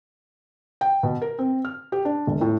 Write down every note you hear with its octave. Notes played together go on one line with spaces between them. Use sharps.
G5
B2
A#4
C4
F6
G4
D4
E1
A2